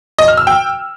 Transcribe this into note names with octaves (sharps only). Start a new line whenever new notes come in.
D#5
F6
E6
G5